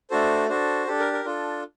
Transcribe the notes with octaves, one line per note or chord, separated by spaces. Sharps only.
A3 D4 F#4 A4 C5
D4 F#4 A4 C5
D4 G4 A4
A#4
A#4
D4 F4 A4